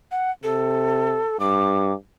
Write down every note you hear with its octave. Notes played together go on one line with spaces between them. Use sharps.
F#5
C3 A4
G2 D6